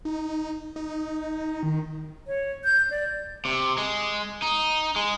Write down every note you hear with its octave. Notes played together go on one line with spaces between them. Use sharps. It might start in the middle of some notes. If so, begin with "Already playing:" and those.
D#4
D#4
D#3
C#5
G6
D5
C3
G#3
D#4
G#3